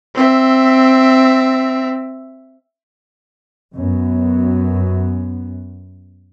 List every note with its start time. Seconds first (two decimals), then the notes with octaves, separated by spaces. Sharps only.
0.15 C4 E5
3.74 F#2 B3